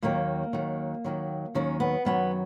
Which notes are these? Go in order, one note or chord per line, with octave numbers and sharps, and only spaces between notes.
D#2 D#3 F#3 A#3
D#2 D#3 F#3
D#2 D#3 F#3
D#2 D#3 F#3 C#4
B3
F#2 D#3 F#3 B3